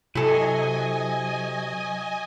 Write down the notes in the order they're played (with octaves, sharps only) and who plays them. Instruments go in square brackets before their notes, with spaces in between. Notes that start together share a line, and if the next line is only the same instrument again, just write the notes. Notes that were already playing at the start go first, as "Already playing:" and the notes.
[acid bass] C3 [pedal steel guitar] F#3 [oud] E4 A4 [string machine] D#5 G#5